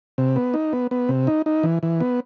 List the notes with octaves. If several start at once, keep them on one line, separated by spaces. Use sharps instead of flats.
C3
B3
D#4
B3
B3
C3
D#4
D#4
E3
E3
B3